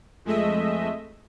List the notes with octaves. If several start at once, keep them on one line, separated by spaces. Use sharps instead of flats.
F2 G#3 A3 D#5 E5